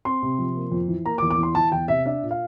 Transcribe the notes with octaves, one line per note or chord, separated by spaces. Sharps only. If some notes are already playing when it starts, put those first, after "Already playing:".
C4 C6
C3
F3
A#3
F2
E3
A#3 A#5
D6
E2
D6
E3 C6
E3 A5
E2 G5
C3 E5
D4 E5
A#2
F5